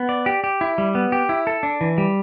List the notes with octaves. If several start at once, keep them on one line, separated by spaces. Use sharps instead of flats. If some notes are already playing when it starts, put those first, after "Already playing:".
Already playing: B3
D5
G4
G4
E4
G3
B3
G4
E4
A4
D4
E3
G3